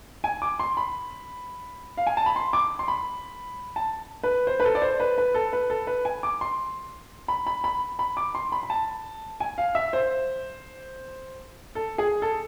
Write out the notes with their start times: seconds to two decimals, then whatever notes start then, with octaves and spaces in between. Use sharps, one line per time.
0.24 G#5
0.42 D6
0.59 C6
0.77 B5
1.98 F5
2.07 G#5
2.17 A5
2.26 B5
2.36 C6
2.53 D6
2.79 C6
2.88 B5
3.76 A5
4.23 B4
4.47 C5
4.60 B4
4.65 A4
4.75 D5
4.82 C5
5.00 B4
5.18 B4
5.34 A4
5.53 B4
5.70 A4
5.87 B4
6.05 G#5
6.23 D6
6.41 C6
7.28 B5
7.47 B5
7.64 B5
7.99 B5
8.17 D6
8.35 C6
8.52 B5
8.63 B5
8.70 A5
9.40 G#5
9.58 F5
9.75 E5
9.93 C5
11.75 A4
11.98 G#4
12.22 A4